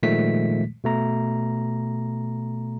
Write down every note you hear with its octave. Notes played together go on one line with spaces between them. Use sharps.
A#2 D#3 F3 G#3 A3 B6
B2 A3 A#5